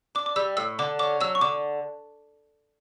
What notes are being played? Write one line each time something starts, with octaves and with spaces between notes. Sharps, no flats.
D4 D6
D6
G3 E6
A2 E6
D3 D6
C#4 D6
F#3 E6
C#6
D3 D6